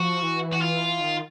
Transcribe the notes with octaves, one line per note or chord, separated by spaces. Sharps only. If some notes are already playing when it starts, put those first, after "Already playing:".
Already playing: F3 F#4
E3
F#4
F4
D#3